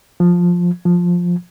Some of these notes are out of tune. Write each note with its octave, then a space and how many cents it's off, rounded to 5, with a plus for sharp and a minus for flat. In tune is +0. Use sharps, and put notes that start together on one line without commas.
F3 +10
F3 +10